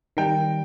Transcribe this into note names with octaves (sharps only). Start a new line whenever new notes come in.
D#3 G3 G5